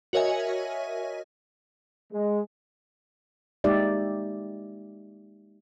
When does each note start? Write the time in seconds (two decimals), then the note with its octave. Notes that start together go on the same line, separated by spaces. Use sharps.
0.13 F#4 A#4 C#5 D#5 E5 G#5
2.13 G#3
3.64 G#3 A#3 D#4 G4 D5 E5